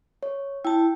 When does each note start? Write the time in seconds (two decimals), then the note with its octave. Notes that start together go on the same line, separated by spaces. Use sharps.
0.23 C#5
0.65 E4 G5 A5